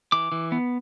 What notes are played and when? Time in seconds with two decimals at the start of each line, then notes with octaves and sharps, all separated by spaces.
0.12 E3 D6
0.32 E3
0.52 B3